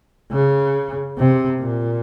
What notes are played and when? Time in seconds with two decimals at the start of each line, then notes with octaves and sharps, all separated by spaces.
0.32 C#3
1.17 C3
1.61 A#2